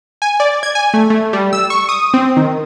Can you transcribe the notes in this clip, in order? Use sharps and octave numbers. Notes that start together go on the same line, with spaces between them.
G#5
D5
G#6
G#5
A3
A3
G3
E6
C#6
D#6
C4
D#3